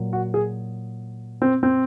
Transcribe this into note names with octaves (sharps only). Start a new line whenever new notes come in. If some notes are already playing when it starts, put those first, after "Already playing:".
Already playing: A#2 F#3
F#4
G#4
C4
C4